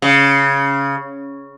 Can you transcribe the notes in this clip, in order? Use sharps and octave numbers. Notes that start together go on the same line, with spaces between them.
C#3